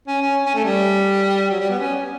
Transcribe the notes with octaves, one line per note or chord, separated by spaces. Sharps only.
C#4
C#4
C#4
A3
G3
F#3
G3
B3
C#4